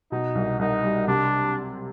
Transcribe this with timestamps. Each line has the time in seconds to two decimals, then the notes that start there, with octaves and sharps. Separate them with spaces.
0.12 B2 D#4
0.35 C2
0.59 C2 D#4
0.84 G3
1.07 C3 D4